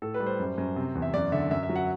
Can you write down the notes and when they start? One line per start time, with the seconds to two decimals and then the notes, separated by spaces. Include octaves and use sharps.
0.02 A2 A4
0.14 B4
0.20 G3
0.26 C5
0.40 F#2
0.58 F#2
0.76 C3
0.95 E2
1.02 E5
1.14 F#2 D5
1.32 D3 E5
1.51 F#2 E5
1.63 E5
1.69 F#3
1.76 F#5